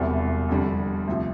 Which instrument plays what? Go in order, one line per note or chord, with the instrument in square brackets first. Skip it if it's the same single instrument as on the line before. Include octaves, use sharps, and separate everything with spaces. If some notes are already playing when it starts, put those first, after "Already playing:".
Already playing: [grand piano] E1 E2 C3 G3
F2 D3 G3
D2 C3 F3